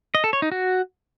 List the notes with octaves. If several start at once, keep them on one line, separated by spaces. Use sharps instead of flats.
D#5
A4
C#5
D#4
F#4